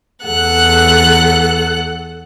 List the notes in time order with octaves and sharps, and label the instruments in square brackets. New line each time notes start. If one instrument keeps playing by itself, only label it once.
[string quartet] E2 A4 F#5 F#6